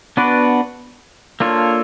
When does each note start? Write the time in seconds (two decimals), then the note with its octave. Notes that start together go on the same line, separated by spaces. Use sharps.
0.17 B3 D4 F#4 B4 D5
1.40 A#3 D4 F4 A4 C#5